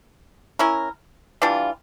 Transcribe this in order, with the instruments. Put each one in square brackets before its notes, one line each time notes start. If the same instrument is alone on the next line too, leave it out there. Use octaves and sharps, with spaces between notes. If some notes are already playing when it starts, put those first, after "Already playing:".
[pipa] C#4 E4 A#4
E3 G3 D4 F4